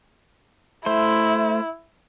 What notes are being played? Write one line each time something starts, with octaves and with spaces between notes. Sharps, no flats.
A3 E4 C5